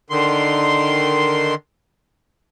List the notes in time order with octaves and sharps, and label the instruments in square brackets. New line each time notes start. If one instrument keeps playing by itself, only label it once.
[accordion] D3 D#3 C6